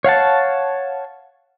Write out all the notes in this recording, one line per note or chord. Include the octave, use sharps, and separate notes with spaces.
C#5 F5 F#5 A5